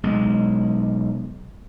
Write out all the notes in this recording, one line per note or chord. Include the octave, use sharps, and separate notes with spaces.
B1 G#3